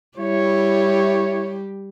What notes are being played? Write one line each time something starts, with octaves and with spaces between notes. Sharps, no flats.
G3 E4 G4 C#5